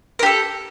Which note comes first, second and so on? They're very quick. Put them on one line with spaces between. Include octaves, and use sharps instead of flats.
A#4 G4 A4